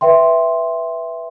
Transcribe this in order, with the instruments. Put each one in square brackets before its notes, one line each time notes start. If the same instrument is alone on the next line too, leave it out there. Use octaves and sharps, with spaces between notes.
[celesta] B4 E5 G5 C6